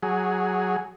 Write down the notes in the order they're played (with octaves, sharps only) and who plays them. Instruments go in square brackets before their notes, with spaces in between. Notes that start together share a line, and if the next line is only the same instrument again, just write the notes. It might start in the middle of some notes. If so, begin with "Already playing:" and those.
[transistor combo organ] F#3 G#4